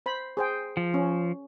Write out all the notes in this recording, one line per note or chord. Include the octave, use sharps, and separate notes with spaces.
C5 B5
G#4 C5 G5
F3
C#4